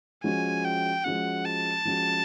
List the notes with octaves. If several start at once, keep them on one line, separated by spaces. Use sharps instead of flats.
F3 G#3 C#4 F#4 G#5
G5
F3 G#3 C#4 F#4 F#5
A5
F3 G#3 C#4 F#4